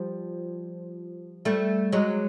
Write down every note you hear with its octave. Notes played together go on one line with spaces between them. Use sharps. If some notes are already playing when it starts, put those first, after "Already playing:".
Already playing: F3 G3
G3 A3
F#3 G#3